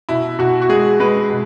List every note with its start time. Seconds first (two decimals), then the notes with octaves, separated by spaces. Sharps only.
0.09 B2 E4
0.39 B2 F#4
0.62 F#4
0.69 G#3 G#4
1.00 G#3 B4
1.30 B2